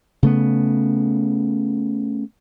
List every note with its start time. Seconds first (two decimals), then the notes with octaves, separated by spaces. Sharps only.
0.23 C#3 A3 B3